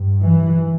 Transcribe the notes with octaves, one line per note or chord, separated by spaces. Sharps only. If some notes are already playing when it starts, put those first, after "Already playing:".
Already playing: G2
E3